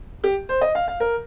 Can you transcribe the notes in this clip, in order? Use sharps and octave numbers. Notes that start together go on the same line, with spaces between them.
G4
C5
D#5
F5
F5
A#4